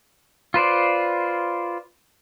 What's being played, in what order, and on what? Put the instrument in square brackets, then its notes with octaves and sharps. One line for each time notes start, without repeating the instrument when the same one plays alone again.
[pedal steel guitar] F4 B4 C5 D5